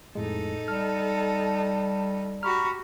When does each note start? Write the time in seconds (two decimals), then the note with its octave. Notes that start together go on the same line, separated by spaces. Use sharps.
0.15 F2 A2 G#3 D#4 A4
0.68 G3 A5 F6
2.43 F#4 G4 A#5 B5 C#6 F6